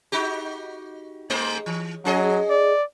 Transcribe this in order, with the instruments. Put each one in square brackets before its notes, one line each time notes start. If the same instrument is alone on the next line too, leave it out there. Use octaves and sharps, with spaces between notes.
[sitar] D#4 F#4 G4
G#2 A3 C5
E3
[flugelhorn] F#3 [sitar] C#4 G#4 D#5
[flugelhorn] D5